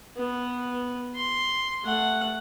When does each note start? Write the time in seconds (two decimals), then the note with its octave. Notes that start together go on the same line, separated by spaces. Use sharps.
0.16 B3
1.15 C6
1.84 A3 F#5